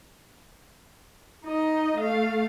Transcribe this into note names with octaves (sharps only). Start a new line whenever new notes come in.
D#4 D#5
A3 F5